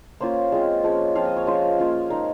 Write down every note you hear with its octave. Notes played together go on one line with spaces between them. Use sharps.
A#3 C#4 F4 C5
G#3 C4 F4
F3 G#3 C#4
F3 C4 F4 F5
D#5
C#5
F3 G#3 C#4 F4 C5
A#3 C#4 F4
G#3 D#4 A#4